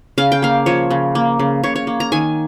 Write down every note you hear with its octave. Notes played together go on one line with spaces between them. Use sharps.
C#3 F5
G5
A#3 F5
F3 C#5
C#3
A#3
C#3
C#3 C#5
C#5
A#3
A#5
D#3 G#5